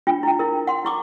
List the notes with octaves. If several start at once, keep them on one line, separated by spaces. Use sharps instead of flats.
D4 F4 G5
E4 G5
E4 A#4
F#5 C6
E4 C#6 D6